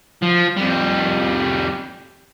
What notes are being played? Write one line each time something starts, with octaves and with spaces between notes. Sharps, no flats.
F3
F2 G3